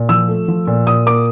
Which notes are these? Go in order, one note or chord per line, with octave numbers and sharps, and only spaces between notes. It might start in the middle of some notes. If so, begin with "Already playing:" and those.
Already playing: A#2
F3 E6
A3
F3
A#2
A#2 D#6
A#3 D6